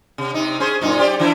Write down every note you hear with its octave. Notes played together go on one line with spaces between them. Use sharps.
C3
C3 D#4
C#4 G#4 C5
F#2 A#2 D#4
G4 C5 D5
E3 D4 E4